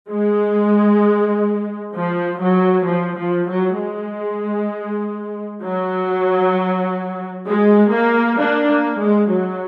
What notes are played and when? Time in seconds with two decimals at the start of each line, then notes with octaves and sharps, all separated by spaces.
0.11 G#3
1.96 F3
2.41 F#3
2.88 F3
3.18 F3
3.49 F#3
3.79 G#3
5.63 F#3
7.48 G#3
7.94 A#3
8.40 A#3 D4
8.71 A#3
9.02 G#3
9.33 F#3